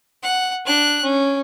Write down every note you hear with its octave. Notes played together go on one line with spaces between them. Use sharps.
F#5
D4 F#6
C#4